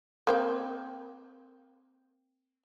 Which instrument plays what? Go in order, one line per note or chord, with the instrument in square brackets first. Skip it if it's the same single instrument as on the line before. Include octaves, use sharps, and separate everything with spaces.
[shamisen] A#3 C4 G5